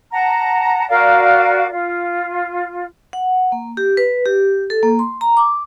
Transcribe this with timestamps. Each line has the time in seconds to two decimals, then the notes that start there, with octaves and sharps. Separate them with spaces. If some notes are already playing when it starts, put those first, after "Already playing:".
0.12 F#5 A5 A#5
0.89 F#4 A#4 D5 F5
1.71 F4
3.13 F#5
3.52 A#3
3.77 G4
3.97 B4
4.26 G4
4.70 A4
4.83 A#3
4.99 C6
5.21 A#5
5.37 D6